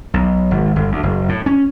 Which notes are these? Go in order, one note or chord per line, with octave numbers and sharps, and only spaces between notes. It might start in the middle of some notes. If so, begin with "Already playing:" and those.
B1
G#1
G1
D2
F#1
A2
C#4